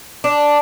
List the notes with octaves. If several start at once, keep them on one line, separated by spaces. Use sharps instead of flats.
D4